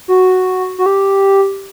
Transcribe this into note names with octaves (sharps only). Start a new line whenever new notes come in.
F#4
F#4
G4